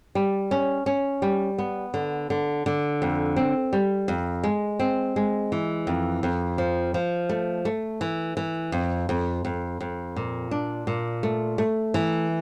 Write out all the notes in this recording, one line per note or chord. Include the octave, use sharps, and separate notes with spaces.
G3
C#4
C#4
G3
B3
D3
D3
D3
F2
C4
G3
F2
G#3
C4
G#3
E3
F2
F2
F3
F3
A3
A3
E3
E3
F2
F2
F2
F2
A#2
D4
A#2
A3
A3
E3